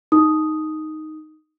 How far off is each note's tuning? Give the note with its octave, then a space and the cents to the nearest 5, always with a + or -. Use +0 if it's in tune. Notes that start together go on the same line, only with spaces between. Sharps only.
D#4 +0 D#6 +0